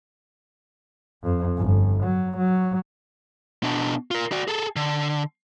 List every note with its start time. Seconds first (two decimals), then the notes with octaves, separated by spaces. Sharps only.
1.23 F2
1.58 G1
2.04 F#3
2.38 F#3
3.63 B2 D4
4.11 F4 A#4
4.32 F#4 D5
4.48 G#4 A4
4.76 D3